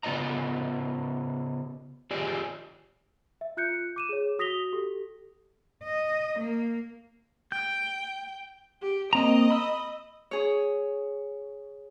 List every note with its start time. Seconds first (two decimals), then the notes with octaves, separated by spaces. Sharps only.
0.03 C#3 B3 F4 D5 D#5 A#5
2.11 F4 G4 G#4 D5
3.41 E5
3.57 F4 F#6 G6 C#7
3.96 D6 D#7 E7
4.09 G#4 C#5
4.39 F#4 D#6 A#6 B6 F7 G7
4.73 G4 A4
5.84 D#5
6.40 A#3
7.52 G5 G6
8.82 G4
9.13 A#3 C4 D#5 A#5
9.50 B5 E6
10.31 G#4 C#5